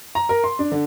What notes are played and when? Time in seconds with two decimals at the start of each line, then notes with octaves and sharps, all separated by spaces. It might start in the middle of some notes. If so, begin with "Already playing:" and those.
0.15 A#5
0.29 A#4
0.44 C6
0.59 D4
0.72 D3